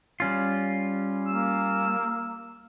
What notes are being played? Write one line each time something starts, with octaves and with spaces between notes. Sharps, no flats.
G3 C#4 F4
A#3 E6